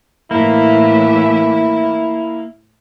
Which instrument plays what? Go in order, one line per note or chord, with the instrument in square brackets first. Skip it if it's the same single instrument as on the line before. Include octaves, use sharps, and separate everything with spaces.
[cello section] A2 E3 E5 [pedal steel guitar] A#3 [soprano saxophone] E4